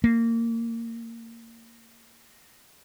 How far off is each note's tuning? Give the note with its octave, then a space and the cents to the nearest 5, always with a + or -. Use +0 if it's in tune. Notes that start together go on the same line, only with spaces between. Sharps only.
A#3 -20